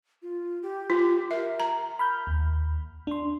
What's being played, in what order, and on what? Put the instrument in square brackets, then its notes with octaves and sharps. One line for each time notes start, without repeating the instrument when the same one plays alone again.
[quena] F4
G4
[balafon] F4
[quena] A#4 [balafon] E5
[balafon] A#5
[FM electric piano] B5 F6 G6
D#2
D4 C6